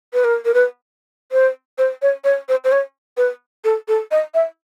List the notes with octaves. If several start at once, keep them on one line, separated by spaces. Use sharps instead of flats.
B4
A#4
A#4
B4
C5
C5
C#5
C#5
C5
C5
C#5
B4
A4
A4
D#5
E5